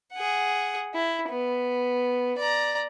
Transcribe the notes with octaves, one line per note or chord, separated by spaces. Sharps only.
G#4 F#5
E4
B3
D5 A#5